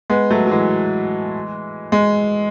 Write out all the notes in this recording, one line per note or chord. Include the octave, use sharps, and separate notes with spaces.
G#3 B3
F#3 A3
F#3
E3 G#3
G#3